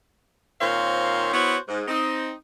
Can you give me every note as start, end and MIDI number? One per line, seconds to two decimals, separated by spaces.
0.60 1.32 46
0.60 1.32 51
0.60 1.32 60
0.60 1.32 72
0.60 1.32 73
0.60 1.32 77
1.34 1.57 59
1.34 1.57 64
1.34 1.57 66
1.34 1.57 72
1.34 1.57 73
1.68 1.83 44
1.87 2.32 60
1.87 2.32 63